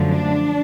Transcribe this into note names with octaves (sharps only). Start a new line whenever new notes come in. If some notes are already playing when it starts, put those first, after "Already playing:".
Already playing: F#2 D3 F3 A3
D4